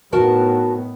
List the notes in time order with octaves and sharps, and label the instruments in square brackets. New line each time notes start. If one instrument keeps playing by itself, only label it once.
[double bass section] A2 D#3 B3 [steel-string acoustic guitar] F#4 A#4 A5